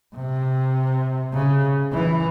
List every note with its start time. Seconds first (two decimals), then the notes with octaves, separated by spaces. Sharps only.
0.16 C3
1.33 C#3
1.92 E3